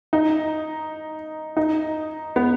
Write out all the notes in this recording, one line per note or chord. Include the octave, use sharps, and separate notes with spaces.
D#4
D#4
B3